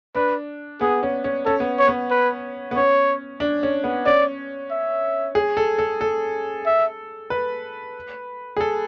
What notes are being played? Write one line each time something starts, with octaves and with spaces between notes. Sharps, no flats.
D4 B4
B3 G#4
C#4
C#4
C#4 A4
B3
C#5
B3
B4
B3
C#4 C#5
D4
C#4
B3
C#4 D5
E5
G#4
A4
A4
A4
E5
B4
G#4
A4